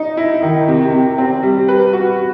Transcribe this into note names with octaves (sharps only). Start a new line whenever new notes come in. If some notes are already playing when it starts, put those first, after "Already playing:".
Already playing: D#4
E4
D#3
C3
C3
C4
G3
B4
F#4